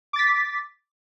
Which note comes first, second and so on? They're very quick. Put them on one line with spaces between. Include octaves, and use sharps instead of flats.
D6 A6 B6